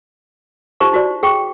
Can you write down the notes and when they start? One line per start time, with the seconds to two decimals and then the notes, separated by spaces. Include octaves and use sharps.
0.80 D#4 F4 G4 C5 A#5 C#6
0.92 D#4 E4 F#4 C5 D5
1.23 G#4 G5 C#6